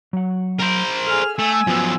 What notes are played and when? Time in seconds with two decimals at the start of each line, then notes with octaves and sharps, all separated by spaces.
0.13 F#3 F#5
0.60 A#4 C5
1.07 G#4 A4 F6
1.39 A3 G#5 E6
1.67 F3 F#3 B3